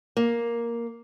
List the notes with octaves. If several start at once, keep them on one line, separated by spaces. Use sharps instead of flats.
A#3